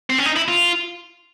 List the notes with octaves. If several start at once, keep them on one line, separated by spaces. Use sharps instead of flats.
C4
C#4
D#4
E4
F4